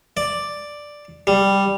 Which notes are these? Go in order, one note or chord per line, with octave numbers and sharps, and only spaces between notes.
D5
G3